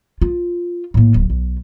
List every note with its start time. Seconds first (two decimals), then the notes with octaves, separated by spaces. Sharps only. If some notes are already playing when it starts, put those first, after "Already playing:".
0.22 F4
0.94 A2 A#3
1.14 D1
1.30 B1